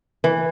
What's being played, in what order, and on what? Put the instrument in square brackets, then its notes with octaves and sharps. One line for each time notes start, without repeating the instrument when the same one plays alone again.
[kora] E3